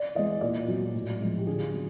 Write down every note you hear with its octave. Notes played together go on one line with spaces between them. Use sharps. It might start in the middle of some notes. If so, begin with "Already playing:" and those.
Already playing: D5
E3 G#3 D#5
A#2 D5
F#3
A2
F3 G#3
G4
D3 G#4
F#3